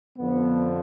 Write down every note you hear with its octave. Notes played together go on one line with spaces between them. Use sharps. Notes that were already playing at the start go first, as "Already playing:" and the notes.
F2 D3 F3 B3